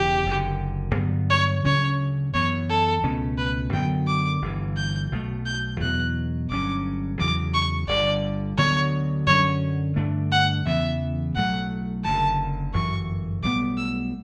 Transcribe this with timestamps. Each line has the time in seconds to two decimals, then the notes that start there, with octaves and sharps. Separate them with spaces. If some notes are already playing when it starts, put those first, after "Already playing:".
Already playing: E1 E2 C#3 G4
0.26 F#1 F#2 D3
0.95 G2 D3 F#3 B3
1.30 C#5
1.64 D2 C#3 F#3 C#4 C#5
2.34 F#2 E3 B3 C#5
2.69 A4
3.03 C#2 B2 A3 C#4
3.38 B4
3.73 F#2 D3 F#3 B3 G5
4.07 D6
4.42 G1 G2 E3
4.77 G6
5.12 B1 B2 A3
5.46 G6
5.80 E2 B2 F#3 F#6
6.51 G1 G2 F#3 C#4 D6
7.19 E2 C#3 F#3 D6
7.54 C#6
7.88 G1 G2 D3 D5
8.57 D2 D3 F#3 B3 C#5
9.27 F#2 D3 F#3 C#4 C#5
9.96 G2 D3 A3 D4
10.32 F#5
10.66 E2 C#3 E3 B3 E5
11.35 B1 A2 F#3 A3 F#5
12.04 F#1 F#2 D3 A5
12.73 G1 F#2 E3 C#6
13.43 B1 A2 G3 B3 D6
13.77 E6